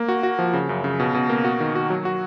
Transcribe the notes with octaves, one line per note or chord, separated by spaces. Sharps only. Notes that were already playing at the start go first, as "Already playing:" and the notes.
Already playing: A#3
F#4
F#4
F3
C#3
F#2
C#3
B2
B2
A#3
F#4
D#3
F#4
F#3
F#4